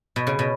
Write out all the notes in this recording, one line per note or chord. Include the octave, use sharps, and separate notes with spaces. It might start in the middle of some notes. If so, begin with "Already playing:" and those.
B2
C#3
B2